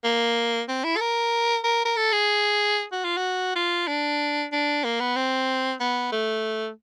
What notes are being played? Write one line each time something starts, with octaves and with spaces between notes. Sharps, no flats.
A#3
C4
E4
A4
A#4
A#4
A#4
A4
G#4
F#4
F4
F#4
F4
D4
D4
A#3
B3
C4
B3
A3